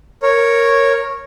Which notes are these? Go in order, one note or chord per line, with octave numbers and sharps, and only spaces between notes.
A#4 C#5